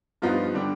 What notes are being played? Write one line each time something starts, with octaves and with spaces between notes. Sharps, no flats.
G2 F3 B3 D#4 F4
D3 G3 D4